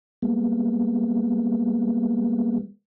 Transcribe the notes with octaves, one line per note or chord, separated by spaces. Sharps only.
G3 G#3 A#3 B3